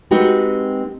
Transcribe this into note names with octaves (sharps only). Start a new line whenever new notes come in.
G#3 C4 D#4 F#4 G4 B4